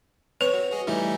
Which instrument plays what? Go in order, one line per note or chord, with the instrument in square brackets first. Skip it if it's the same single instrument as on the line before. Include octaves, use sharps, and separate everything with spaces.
[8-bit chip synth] C4 [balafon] B4 [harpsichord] C#5
[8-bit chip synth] F#4
F#4 G#4 D#5
[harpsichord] E3 [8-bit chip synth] G3 A3 D#4